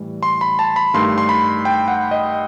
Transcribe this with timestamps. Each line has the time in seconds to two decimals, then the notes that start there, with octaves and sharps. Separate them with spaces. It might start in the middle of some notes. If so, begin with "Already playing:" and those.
Already playing: A2 E3 G3
0.23 C6
0.41 B5
0.59 A5
0.76 B5
0.94 G2 D#3 A3 C6
1.18 C6
1.29 B5
1.65 G5
1.88 F#5
2.11 D#5